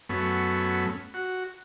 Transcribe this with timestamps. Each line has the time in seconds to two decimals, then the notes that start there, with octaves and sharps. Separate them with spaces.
0.09 F#2 A3 B3 C#4
1.14 F#4